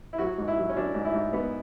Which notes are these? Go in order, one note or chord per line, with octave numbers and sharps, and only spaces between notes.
E4
F#3 F#4
G#2
E4
F#3
C#4
F#3 D4
G#2
E4
G#2
G#2 B3